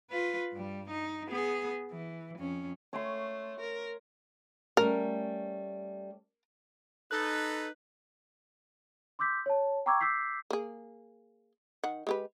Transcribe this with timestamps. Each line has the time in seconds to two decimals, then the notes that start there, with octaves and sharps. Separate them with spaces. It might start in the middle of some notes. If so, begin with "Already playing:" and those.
0.11 F4 B4
0.53 G2 G3
0.90 D#4
1.28 B3 G#4
1.92 E3
2.39 F2 C#4
2.93 A3 C#5 C6
3.60 A#4
4.77 G3 A3 C#4 A#4
7.11 D#4 A4 B4 F#6
9.19 C6 D6 E6 G6 B6
9.46 C#5 A5
9.86 G5 A#5 C#6 D6 E6 G#6
10.00 D6 E6 G6 B6 C7
10.50 A#3 G#4
11.84 D#3 F#5
12.07 G#3 G4 B4